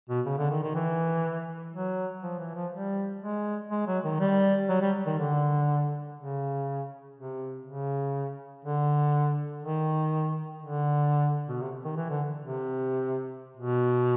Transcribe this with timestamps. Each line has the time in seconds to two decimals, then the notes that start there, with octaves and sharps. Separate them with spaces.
0.09 B2
0.26 C#3
0.38 D3
0.51 D#3
0.63 D#3
0.75 E3
1.73 F#3
2.23 F3
2.39 E3
2.56 F3
2.72 G3
3.22 G#3
3.71 G#3
3.87 F#3
4.04 D#3
4.20 G3
4.69 F#3
4.82 G3
5.06 D#3
5.19 D3
6.17 C#3
7.17 C3
7.66 C#3
8.65 D3
9.63 D#3
10.62 D3
11.48 B2
11.61 C3
11.85 D#3
11.97 E3
12.10 D3
12.42 C3
13.57 B2